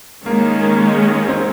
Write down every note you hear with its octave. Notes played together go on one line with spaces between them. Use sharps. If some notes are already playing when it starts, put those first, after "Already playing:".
D#3 G#3 A#3 C#4
A#3
C4